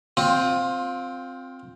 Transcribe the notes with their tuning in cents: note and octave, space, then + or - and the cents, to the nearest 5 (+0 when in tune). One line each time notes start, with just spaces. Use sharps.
C4 +0 F4 +20